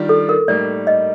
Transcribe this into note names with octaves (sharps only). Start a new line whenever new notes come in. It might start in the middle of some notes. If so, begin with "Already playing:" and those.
Already playing: D#3 G3 D4 F4
A4
A#4
A2 G3 A#3 D#4 D5
D#5